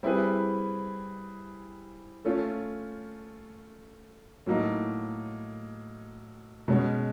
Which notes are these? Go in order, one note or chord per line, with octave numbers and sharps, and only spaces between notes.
G3 C4 E4 G#4 B4
A3 C#4 F4
A2 F#3 A#3 D#4
B2 G#3 C#4